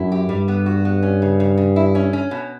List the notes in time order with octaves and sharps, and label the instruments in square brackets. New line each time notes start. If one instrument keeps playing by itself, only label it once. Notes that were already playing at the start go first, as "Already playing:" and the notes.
Already playing: [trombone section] F#2 [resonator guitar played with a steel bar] E4
[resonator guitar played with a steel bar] G4
[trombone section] G2 [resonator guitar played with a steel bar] G3
[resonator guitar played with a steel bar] B3
F#4
B3
C#4
C#3
C#3
C#3
E4
C#4
C#4
B2